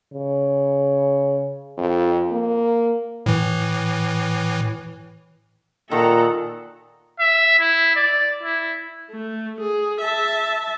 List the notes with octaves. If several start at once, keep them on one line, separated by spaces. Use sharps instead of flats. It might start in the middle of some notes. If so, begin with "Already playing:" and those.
C#3
F2
A#3
A2 E3
A#2 D#3 A4 F#5 A#5
E5
E4
D5
E4
A3
G#4
E5 A5